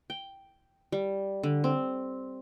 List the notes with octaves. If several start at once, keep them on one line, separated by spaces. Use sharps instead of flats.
G5
G3
D3
C4